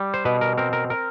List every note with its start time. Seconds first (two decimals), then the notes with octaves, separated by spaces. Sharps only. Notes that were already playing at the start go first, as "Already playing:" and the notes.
Already playing: G3
0.14 C5
0.25 B2 B4
0.41 A#4
0.58 C4 A#4
0.73 A#4
0.90 A#4